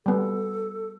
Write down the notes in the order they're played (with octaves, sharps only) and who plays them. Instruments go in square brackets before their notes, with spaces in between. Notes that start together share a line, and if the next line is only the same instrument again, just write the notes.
[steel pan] G3 B3 [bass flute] A4